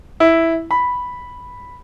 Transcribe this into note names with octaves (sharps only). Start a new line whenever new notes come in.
E4
B5